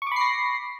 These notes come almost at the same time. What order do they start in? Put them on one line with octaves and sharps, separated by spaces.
C#6 D6 B5 C7 A#6